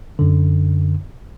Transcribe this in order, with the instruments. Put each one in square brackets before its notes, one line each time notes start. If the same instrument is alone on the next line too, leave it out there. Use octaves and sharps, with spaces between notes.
[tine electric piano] F#2 D3